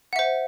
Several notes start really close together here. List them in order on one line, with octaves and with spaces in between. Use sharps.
F#5 E5 C5